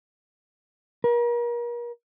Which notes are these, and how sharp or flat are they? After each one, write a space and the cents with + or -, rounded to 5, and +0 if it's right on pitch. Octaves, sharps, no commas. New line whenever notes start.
A#4 +40